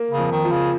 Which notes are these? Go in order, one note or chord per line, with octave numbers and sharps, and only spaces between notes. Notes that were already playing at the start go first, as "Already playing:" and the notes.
Already playing: A#3
C#3
F2
D#3
F3
C#3